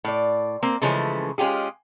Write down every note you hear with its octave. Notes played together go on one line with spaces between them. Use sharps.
A2 D5
A#3 C4
C#3 E3 F3 G#3 A3 C#4
G#3 C#4 F4 G4 G#4